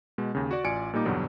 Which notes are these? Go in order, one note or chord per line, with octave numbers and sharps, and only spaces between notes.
B2 G#3
D#2 C#3
F#4 D5
A1 F4 D5 G#5 C#7 D7
A#2 G3 A#3 D#4 D6
E2 G2 B2 D3 F#3 G3